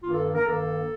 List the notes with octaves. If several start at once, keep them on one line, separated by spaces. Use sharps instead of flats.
G2 D#3 A#3 F4
A4
A#4
G2 D#3 A#3 A4